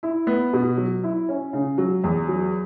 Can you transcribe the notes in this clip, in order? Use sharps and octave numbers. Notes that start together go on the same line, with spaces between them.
E4
B3
B2
F#3
E4
C#4
C#3
F#3
E2
F#3